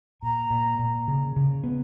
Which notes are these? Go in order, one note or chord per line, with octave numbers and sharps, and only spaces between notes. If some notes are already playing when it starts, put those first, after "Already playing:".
A#2 A#5
A#2
A#2
C#3
C#3
B3